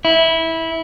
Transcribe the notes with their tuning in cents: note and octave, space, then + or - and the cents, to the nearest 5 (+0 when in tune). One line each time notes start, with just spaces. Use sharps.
E4 -15